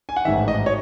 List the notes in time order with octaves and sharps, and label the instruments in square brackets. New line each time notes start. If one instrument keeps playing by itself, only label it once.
[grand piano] G#5
F#5
A1 G#2 D#3 E5
D#5
C#5